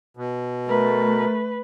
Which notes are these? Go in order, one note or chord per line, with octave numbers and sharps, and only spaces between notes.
B2
A3 A#4 B4